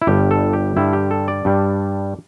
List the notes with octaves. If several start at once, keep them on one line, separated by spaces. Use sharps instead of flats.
E4
G1 G2 G3 G4
A4
G4
G2 D3 G3 E4
G4
A4
D5
G2 G3 D4